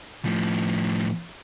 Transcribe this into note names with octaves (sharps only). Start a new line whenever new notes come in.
A2 F3